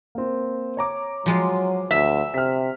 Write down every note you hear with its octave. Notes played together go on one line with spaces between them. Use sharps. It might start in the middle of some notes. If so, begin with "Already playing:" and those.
A#3 C4
C#5 A#5 D6
F3 F#3 G#3 F4
D2 E5
C3 F6 B6